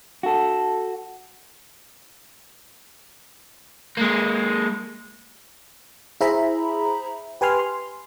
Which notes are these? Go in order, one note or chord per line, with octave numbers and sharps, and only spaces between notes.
F#4 A4
G#3 A#3
E4 G#4 C5 E5 A#5 B5
G4 B4 G#5 C6 F6
C6